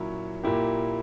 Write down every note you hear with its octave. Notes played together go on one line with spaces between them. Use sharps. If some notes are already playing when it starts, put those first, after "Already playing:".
Already playing: A#2 F#3 C#4 E4
A#2 A#3 E4 G4